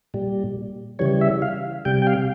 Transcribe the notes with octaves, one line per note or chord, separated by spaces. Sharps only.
A#2 G3
C#3 E3 G3 C#5
E5
F5
C3 G3 G5
G5
F5